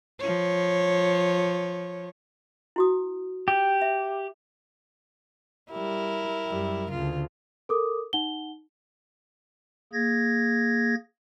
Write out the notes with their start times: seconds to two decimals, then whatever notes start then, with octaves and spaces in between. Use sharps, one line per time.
0.19 F3 C#5
2.76 E4 F#4 D#6
3.48 G4
3.82 E5
5.72 G3 E4 A#4
6.47 F#2 G3
6.91 D2 C#3 F4
7.69 A4 A#4 D6 D#6
8.13 D#4 F#5 G7
9.93 A#3 G#4 G#6 A#6